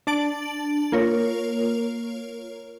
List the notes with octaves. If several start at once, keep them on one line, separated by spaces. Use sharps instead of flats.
D4 A5 A6 D7 F#7
A#3 F4 A#4 C#5